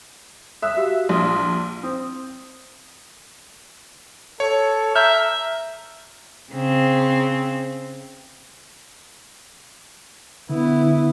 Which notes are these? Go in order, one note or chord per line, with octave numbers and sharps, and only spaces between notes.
E5 D#6 E6 F#6
F#4 G4 F5
A#1 C6 D#6 F6
C4 D#6
A4 C#5
E5 A#5 F6 G6
C#3 C4
D3 B3 E4